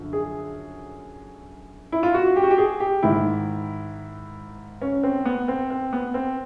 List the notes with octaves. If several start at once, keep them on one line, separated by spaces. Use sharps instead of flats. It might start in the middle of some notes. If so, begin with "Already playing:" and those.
Already playing: F#2 D3 F3
G#4
E4
F4
F#4
G4
F#4
G4
G#4
G4
G#2 D#3 E4
C#4
C4
B3
C4
C4
B3
C4